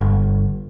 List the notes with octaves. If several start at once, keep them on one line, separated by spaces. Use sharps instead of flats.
G1